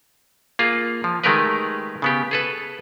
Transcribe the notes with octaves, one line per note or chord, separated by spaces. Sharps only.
A#3 F4 G#4
F3
D#3 G#3 A3 G4 A#4 B4
C#3 B3 G4
G#4 A4 B4